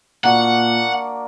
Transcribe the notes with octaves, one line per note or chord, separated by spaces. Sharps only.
A#2 A#3 D4 F#4 F#5